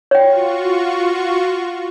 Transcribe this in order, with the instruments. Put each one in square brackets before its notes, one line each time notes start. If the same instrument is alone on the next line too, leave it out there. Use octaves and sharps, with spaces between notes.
[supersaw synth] F4 F#4 C#6 [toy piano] C#5 G5